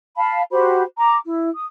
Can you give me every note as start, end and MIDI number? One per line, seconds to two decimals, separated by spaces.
0.17 0.42 77
0.17 0.42 81
0.17 0.42 83
0.52 0.83 66
0.52 0.83 67
0.52 0.83 72
0.52 0.83 83
0.98 1.16 82
0.98 1.16 86
1.25 1.49 64
1.55 1.64 87